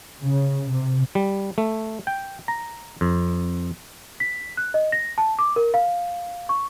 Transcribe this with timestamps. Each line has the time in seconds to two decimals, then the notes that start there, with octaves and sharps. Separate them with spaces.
0.22 C#3
0.69 C3
1.15 G3
1.58 A3
2.07 G5
2.48 A#5
3.01 F2
4.20 B6
4.57 F#6
4.74 D#5
4.92 A#6
5.18 A5
5.39 D6
5.56 A#4
5.74 F5
6.49 C#6